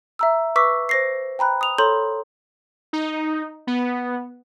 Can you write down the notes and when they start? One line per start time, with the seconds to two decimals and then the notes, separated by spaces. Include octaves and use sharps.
0.19 E5 A#5 E6
0.56 B4 C#6 D6 E6 B6
0.89 C5 A#6 C7
1.39 G5 A#5 B5 F#6
1.61 D#6 F7
1.78 A4 C#5 A#5 C6 G6 F#7
2.93 D#4
3.67 B3